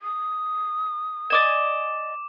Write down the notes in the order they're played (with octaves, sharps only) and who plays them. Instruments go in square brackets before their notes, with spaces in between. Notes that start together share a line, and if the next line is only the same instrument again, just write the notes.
[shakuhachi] D#6
[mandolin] D5 D#5 G#5 [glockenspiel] D6 E7